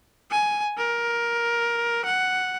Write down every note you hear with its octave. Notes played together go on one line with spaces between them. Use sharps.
G#5
A#4
F#5